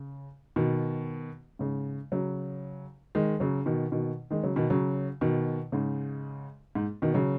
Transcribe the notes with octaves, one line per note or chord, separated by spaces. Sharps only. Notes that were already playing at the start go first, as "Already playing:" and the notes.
Already playing: C#3
B2 D#3
G#2 C#3
C#3 F#3
D#3 G#3
C#3 F#3
B2 D#3
B2 D#3
D#3 G#3
C#3 F#3
B2 D#3
C#3 F#3
B2 D#3
G#2 C#3
G#2
B2 D#3
C#3 F#3